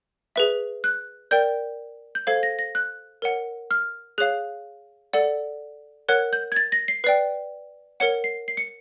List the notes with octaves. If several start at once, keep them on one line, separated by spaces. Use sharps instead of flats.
G#4 B4 E5
F#6
A#4 D5 G5 G6
G6
A4 C5 F5 G#6
A#6
A#6
F#6
A#4 C#5 F#5
F6
G#4 C#5 F5 F#6
A4 D5 F#5
A#4 C#5 F#5 F#6
G6
G#6
A6
A#6
C7
B4 D5 G5 C7
A#4 C#5 F#5 C#7
C7
C7
C#7